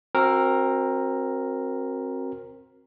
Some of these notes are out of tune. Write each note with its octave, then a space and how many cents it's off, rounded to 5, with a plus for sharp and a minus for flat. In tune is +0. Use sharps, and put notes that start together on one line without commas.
C4 +25 F#4 -10 A#4 +0